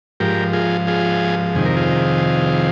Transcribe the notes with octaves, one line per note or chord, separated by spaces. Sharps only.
G#2 F3 G4 A#4
F4 G#4
F4 G#4
F2 C3 D#3 G#4
A#4
F4 G#4